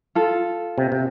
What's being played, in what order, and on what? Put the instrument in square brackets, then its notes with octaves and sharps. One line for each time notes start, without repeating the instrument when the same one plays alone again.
[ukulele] F4 A4
[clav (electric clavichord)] C3
C3